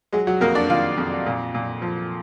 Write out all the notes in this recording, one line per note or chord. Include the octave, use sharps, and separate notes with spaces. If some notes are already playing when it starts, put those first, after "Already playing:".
F#3 G#3 G#4
F#3 F#4
F2 A#3 A#4
D4 D5
D#3 F4 F5
F2
A#2
A#2
F3